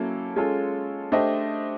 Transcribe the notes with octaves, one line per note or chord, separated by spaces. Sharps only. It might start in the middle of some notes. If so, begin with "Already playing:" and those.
Already playing: F#3 A#3 C#4 E4 A4
G#3 C#4 F4 A4
A3 D4 G4 C5 D#5